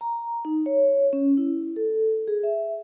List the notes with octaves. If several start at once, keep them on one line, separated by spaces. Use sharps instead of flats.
A#5
D#4
C#5
C#4
E4
A4
G#4
E5